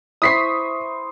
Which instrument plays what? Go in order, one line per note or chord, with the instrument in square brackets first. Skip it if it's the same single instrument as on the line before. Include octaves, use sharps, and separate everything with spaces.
[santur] E4 C5 C#6 [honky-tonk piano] D#6 B6 C7